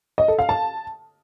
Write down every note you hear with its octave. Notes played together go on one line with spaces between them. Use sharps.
D#5
A4
F5
A5